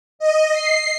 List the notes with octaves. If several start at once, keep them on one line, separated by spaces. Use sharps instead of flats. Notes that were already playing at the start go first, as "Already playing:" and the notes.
D#5
C7